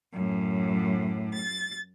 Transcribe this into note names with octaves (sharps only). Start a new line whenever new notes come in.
F#2 A2
A6